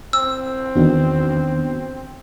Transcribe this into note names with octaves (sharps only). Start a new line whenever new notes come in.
C4 E6
E2 D#3 B3 D4 F#4